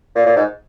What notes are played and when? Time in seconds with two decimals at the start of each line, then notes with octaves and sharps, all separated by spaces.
0.15 A#2
0.26 A#2
0.36 G#2